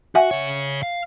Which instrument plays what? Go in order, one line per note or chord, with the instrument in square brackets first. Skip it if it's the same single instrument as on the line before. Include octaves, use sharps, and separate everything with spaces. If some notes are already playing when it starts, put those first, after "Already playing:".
[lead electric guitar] F#4 [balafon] E5 F#5 G#5
[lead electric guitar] C#3 C#5
F5